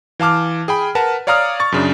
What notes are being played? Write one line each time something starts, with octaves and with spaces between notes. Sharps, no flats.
E3 F5 A5 D6 F6
G#4 G5 B5
A#4 B4 F#5 A5
C#5 D5 F5 A#5 D#6 F6
C#6 A6
F#2 C#3 D4